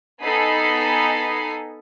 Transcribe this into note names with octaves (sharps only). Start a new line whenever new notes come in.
B3 D#4 A4 G#5 B5 C7